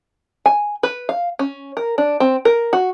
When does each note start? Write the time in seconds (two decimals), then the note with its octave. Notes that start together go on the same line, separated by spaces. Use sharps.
0.46 G#5
0.83 B4
1.09 F5
1.39 C#4
1.77 A#4
1.98 D4
2.20 C4
2.45 A#4
2.73 F#4